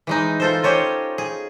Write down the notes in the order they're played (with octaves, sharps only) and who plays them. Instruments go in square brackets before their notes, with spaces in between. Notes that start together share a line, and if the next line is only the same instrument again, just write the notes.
[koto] E3 G#3 D#4
F4 A4 C5
C#4 G4 C5 C#5 D#5
G#4